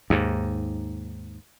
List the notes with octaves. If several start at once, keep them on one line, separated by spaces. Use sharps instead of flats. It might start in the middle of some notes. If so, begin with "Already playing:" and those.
D#2 G#2